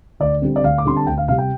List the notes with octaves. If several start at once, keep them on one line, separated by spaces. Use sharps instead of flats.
D2 D5
D3 G3 C4
D5
D2 F5
D6
D3 G3 C4 C6
A5
D2 G5
F5
C3 G3 F5
G5